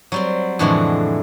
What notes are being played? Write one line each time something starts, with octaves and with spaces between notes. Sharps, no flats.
F#3 G3 C4
F2 A2 D3 E3 G#3 F#4